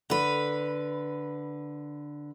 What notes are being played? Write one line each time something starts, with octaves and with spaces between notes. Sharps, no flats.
D3 B4